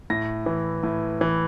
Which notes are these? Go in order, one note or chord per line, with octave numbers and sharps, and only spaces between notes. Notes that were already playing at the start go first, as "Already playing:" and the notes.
A2 A#6
E3
A2
E3